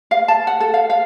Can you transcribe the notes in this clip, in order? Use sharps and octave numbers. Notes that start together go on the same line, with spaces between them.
F5
A5
F#5
A4
F5
F5